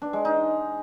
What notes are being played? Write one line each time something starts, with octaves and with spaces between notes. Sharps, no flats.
D4
G#3
D#4